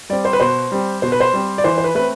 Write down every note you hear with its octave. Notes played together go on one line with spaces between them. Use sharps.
G3 C4 D5
C5
B4
B2 C5
G3 C4
B2 C5
B4
C5
G3 C4
D5
E3 C5
C5
B4
A3 C4 B4